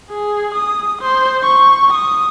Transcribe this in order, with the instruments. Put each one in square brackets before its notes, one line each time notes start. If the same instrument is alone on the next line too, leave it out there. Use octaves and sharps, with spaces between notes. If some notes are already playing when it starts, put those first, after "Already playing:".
[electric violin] G#4
D#6
C5
C#6
D#6